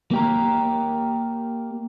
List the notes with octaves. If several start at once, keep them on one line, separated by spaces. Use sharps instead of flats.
A#3 G4 A#4